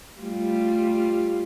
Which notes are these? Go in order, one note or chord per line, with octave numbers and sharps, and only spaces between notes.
G3 A3 F4